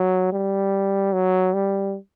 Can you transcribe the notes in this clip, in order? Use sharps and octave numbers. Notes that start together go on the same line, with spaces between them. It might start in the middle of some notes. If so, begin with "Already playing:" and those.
Already playing: F#3
G3
F#3
G3